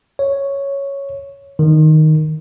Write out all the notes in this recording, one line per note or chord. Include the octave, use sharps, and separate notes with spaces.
C#5
D#3